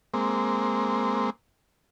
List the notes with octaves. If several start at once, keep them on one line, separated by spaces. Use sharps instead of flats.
G#3 A#3 C4